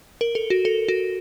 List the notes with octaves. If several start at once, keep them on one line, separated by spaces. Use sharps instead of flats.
A#4
A4
F#4
A4
F#4